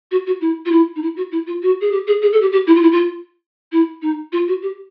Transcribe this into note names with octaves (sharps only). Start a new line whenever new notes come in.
F#4
F#4
E4
F4
E4
D#4
E4
F#4
E4
F4
F#4
G#4
G4
G#4
G#4
A4
G4
G4
E4
F4
E4
F4
E4
D#4
F4
F#4
G4